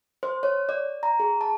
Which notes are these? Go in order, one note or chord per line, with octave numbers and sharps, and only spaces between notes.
C5
C#5
D5
A#5
G#4
A5